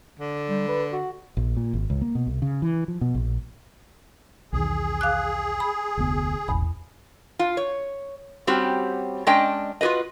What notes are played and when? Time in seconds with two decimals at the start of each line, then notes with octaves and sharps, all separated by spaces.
0.20 D3
0.50 G3
0.69 B4
0.92 F#4
1.37 A#1
1.57 A#2
1.73 G#1
1.90 C#2
2.02 A#3
2.15 B2
2.27 C2
2.42 C#3
2.62 E3
2.88 F3
3.01 B2
3.15 A#1
4.53 B1 E2 D#3 G#4
5.01 F5 D6 F#6
5.60 B5
5.97 F1 D2 B3
6.48 E1 A1 E2 B5
7.39 F4
7.57 C#5
8.47 G3 C4 C#4 F#4 G4
9.27 G#3 C#4 D4 D#5 G5
9.81 F4 F#4 G#4 B4 D#5